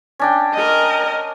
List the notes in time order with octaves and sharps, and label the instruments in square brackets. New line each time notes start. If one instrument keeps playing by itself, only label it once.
[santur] C#4 D4 G5
[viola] A#4 D#5